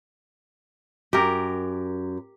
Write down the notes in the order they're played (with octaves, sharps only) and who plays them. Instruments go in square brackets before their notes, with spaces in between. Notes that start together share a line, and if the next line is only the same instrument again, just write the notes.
[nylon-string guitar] F#2 [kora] G4 A#4